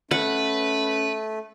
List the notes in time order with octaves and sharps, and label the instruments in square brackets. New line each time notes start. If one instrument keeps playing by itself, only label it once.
[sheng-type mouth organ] A3 [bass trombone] C#4 [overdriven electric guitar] B4 [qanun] F#5